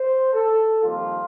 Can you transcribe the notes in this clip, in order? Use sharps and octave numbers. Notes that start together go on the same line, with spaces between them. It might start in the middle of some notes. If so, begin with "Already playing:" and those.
Already playing: C5
A4
F2 D#3 G3 A#3 F4